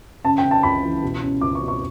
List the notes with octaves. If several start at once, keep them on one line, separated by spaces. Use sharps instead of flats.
C#3 A5
G5
C#3
A5
C#2 B5
E3
B2
C#4
C#2 D6
C#6
B2
C#6